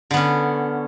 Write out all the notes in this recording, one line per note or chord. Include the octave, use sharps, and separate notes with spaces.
D3 B3 C#4